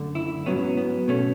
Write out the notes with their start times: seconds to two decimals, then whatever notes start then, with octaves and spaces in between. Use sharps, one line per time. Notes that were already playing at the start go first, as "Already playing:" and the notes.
Already playing: F#2 D3 A3
0.15 E4
0.46 G#2 F#3 B3 C#4
0.77 B3
1.08 B2 A3 C#4